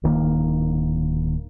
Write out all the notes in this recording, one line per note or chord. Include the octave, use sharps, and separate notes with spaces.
D1 D#3 A#3